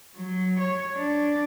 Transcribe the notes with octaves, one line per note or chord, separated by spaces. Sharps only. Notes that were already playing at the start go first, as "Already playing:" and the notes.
F#3
C#5
D4